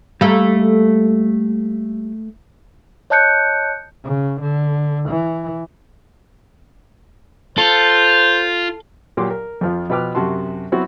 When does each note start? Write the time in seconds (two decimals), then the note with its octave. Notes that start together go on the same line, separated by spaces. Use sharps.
0.21 G3 A3 A#3
3.10 C#5 D#5 A5 F#6 G6 C#7
4.04 C#3
4.41 D3
5.09 E3
7.58 F4 A4 C5
9.17 A#2 F#3 G4 C6 D6
9.30 A#4
9.61 F2 F3 F4
9.90 B2 F3 B4 G5 D6 F6
10.15 F#2 C3 F#4 A5 C6
10.72 F#3 B3 C4 E4 F#4